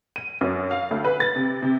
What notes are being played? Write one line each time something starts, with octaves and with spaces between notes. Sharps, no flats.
D#7
F#2
F5
D2
B4
A6
C3
C3